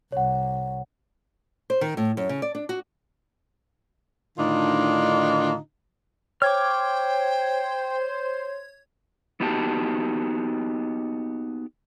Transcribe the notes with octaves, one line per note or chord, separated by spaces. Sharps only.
C2 C#5 F#5
C5
D#3
A2
F#2
C#3
D5
D4
F#4
A2 D3 D#3 D4 D#4 F4
C5 C#5 G5 D6 F6 G#6
A#3 B3 D#4 F#4 G4 A5